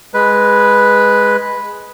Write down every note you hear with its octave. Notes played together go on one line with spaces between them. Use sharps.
G#3 B4